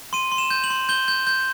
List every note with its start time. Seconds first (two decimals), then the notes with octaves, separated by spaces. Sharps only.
0.13 C6 D#7
0.32 C6
0.38 E7
0.50 G6
0.64 F#7
0.70 C6
0.89 G6 G7
1.08 G6
1.27 G6